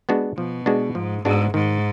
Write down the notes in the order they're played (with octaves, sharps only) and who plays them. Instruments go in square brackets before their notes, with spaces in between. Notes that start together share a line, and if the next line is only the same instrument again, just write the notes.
[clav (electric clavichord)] G#3 B3 D4 F#4
[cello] B2 [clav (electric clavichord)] F3
[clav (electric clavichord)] G#3 B3 D4 F#4
[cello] G#2 [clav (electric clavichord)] F3
[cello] G#2 [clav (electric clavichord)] G#3 B3 D4 F#4
[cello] G#2 [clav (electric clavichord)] D#3